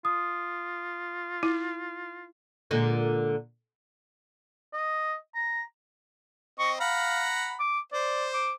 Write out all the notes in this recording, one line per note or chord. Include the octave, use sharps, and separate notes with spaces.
F4 D#6
E4
A#2 D3 G#3
D#5
A#5
C4 D#5 C#6
F5 F#5 A#5 B5
D6
C5 D5
D6